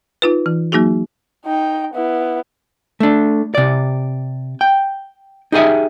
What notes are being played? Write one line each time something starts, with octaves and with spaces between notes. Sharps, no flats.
D#4 F4 B4
E3
F#3 A#3 D#4 F#4 G#4
D#4 G5
B3 E4
A3 D4
C3 D5
G5
D#4 G4 G#4 D#5 E5